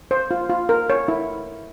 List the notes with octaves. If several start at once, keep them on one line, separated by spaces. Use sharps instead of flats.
C5
F4
F4
A#4
C#5
E4